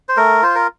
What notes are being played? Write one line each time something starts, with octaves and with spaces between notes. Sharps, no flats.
C5
A3 A#4
F4 C5
A#4